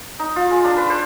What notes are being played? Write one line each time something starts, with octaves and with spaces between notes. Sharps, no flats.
D#4
F4
G#3
D4
B4
C5